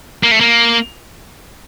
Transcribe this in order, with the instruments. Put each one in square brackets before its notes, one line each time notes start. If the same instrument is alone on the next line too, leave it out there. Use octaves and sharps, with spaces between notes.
[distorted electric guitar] A#3
A3
A#3